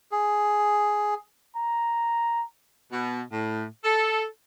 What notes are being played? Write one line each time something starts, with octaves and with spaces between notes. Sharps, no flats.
G#4
A#5
B2
A2
A4